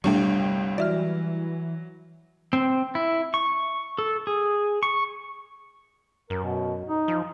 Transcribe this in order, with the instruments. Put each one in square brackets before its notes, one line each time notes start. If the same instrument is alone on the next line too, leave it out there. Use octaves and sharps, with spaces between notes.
[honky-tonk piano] G1 C2 G5 [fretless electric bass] G3 [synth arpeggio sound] A3 D4 C#6
[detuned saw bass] E3 [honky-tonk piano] F#3 [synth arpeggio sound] D5 E5 F6
[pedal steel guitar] C4
E4
C#6
A4
G#4
C#6
[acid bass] F#2 [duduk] A#4
[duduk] B2
D#4
[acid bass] F3